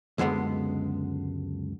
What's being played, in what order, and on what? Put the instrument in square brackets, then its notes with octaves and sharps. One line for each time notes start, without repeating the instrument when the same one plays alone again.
[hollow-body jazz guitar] C#2 F#2 D3 G#3 B3